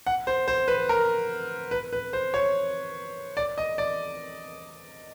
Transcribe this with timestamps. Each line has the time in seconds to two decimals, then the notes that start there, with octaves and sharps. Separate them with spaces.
0.07 F#5
0.27 C5
0.48 C5
0.68 B4
0.89 A#4
1.71 B4
1.93 B4
2.13 C5
2.34 C#5
3.37 D5
3.58 D#5
3.78 D5